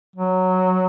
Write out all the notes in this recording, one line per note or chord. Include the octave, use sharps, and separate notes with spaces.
F#3